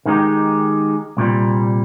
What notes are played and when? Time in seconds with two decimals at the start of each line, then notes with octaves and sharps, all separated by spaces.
0.06 D#3 G#3 D#4 G4
1.17 C2 A#2 G3